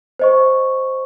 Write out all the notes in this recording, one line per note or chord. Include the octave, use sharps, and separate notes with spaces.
C5 D#5 C#6